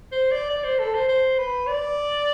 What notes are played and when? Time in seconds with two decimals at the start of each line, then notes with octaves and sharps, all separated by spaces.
0.12 C5
0.31 D5
0.50 D5
0.64 C5
0.79 A4
0.94 C5
1.09 C5
1.39 B4
1.67 D5